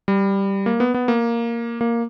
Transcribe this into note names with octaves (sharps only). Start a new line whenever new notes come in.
G3
A#3
B3
B3
A#3
A#3